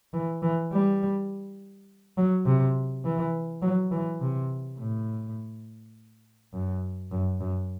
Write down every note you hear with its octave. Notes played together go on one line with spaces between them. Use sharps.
E3
E3
G3
F#3
C3
E3
F#3
E3
C3
A2
F#2
F#2
F#2